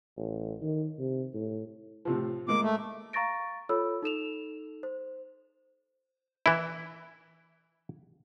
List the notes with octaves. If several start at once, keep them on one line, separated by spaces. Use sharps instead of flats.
A1
D#3
C3
A2
A2 C3 F3
A2 G#3 A#3 D6
A3
F5 A#5 C#6 A6 A#6 D7
F4 A4 C#5 B5 E6
D#4 A4 E7 F7
C5
E3 E4